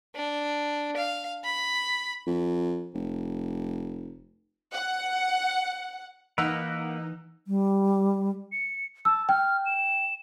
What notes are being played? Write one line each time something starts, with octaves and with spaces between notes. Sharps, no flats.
D4
F5
B5
F2
F1
F#5
E3 A#3 D#4 A#4 B4 F#5 E6 F#6
G3
C#7
A5 E6
G5 F6
E7